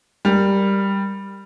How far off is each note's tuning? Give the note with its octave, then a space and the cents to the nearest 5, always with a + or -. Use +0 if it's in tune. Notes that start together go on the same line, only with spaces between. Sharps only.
G3 +5 A#4 +0